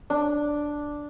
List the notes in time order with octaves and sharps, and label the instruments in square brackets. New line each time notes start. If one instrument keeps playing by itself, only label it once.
[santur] D4